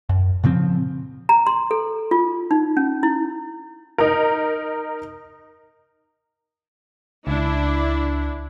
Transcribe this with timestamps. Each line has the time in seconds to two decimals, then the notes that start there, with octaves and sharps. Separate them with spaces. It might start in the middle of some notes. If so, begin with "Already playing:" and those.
0.09 F#2
0.44 A#2 C#3 F3 C4
1.29 A#5
1.47 C6
1.71 A4
2.11 F4
2.51 D#4
2.77 C#4
3.03 E4
3.98 D#4 A#4
7.27 C#2 D4 E4